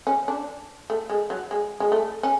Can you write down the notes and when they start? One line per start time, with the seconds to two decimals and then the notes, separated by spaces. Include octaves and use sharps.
0.07 C#4
0.28 D4
0.90 A3
1.10 G#3
1.30 F#3
1.51 G#3
1.80 G#3
1.92 A3
2.23 C#4